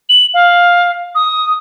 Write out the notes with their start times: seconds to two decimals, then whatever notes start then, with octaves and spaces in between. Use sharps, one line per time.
0.09 F#7
0.34 F5
1.15 D#6